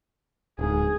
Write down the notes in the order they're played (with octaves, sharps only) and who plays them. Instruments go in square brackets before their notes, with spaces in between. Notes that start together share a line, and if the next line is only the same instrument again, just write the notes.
[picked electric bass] D1 G#2 [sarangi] G#4